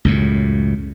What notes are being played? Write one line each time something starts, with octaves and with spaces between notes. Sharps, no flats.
C#2 F#2 A2